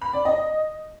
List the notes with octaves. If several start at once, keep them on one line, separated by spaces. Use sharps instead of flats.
B5
D5
D#5